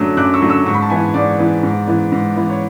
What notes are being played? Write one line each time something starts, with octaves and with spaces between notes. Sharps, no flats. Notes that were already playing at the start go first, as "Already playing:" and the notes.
Already playing: F#2 D3 F#3 A3
F#2 D6 F#6
C#6 E6
D3 F#3 A3
C#6 E6
G#2 C#6
B5
A5
E3 B3 E4 G#5 B5
G#2 D5
E3 B3 E4
G#2
E3 B3 E4
G#2
E3 B3 E4
C#5